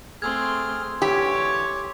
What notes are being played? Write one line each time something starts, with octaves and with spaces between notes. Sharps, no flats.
A3 C4 G#4 C6 E6 F6 G#6
D3 E3 G4 C#5